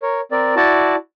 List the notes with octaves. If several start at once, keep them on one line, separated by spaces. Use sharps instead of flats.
A#4 C#5
C4 A#4 D5
E4 F#4 D5 A5